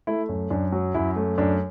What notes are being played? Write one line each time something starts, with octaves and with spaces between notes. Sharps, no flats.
A3 E4
F#2
F#2 D4
F#3
F#2 E4
A3
F#2 D4